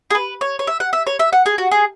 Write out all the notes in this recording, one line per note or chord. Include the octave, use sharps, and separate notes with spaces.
G#4
B4
C#5
C#5
E5
F#5
E5
C#5
E5
F#5
G#4
F#4
G#4